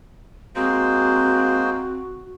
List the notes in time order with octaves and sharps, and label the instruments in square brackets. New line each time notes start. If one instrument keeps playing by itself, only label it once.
[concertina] G#3 A#3 C5 [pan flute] C4 [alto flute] F#4